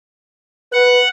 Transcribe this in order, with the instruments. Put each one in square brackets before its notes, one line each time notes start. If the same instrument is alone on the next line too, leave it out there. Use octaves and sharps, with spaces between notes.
[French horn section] B4 [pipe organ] F#5